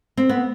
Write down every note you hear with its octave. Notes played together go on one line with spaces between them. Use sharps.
C4
B3